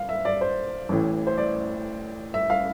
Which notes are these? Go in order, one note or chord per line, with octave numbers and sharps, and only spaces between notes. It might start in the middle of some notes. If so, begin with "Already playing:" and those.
Already playing: F5
E5
D5
C5
A1 A2 E3
C5
D5
E5
F5